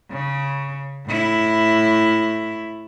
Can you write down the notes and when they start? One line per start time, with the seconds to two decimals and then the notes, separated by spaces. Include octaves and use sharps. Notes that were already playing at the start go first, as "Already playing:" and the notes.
0.11 C#3
1.06 A2 E4